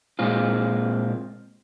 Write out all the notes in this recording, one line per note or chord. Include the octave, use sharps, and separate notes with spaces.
A#2 G#3 C4 F4